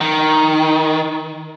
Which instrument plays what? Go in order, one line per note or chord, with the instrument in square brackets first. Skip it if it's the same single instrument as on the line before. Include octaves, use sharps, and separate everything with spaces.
[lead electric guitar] D#3